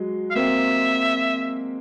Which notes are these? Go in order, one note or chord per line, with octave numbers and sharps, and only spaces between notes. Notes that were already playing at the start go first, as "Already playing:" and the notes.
Already playing: F#3 G#3
F5
A#3 C4 E5